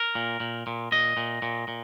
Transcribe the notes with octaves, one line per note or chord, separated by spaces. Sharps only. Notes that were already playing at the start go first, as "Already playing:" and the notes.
Already playing: A#4
A#2
A#2
A#2
A#2 D#5
A#2
A#2
A#2